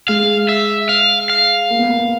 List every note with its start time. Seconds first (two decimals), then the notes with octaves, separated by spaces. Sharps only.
0.08 G#3 F5
0.49 E5
0.89 F5
1.29 F5
1.70 A#3
1.79 B3
1.90 A#3